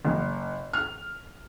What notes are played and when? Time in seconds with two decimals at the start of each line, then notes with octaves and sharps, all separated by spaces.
0.05 F#1
0.73 F6